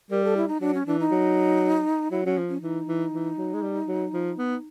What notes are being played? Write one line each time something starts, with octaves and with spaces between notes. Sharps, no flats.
G3 A#4
A4
E4
D#4
F#3 D4
C#4
E3 D4
D#4
F#3
F#3 E4
F#3 C#4
F3
C#4
E3 D#4
E3
E3
F#3
G#3
G3
F#3
F3
B3